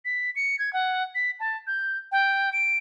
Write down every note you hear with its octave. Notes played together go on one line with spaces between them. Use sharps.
B6
C#7
G#6
F#5
B6
A5
G6
G5
D7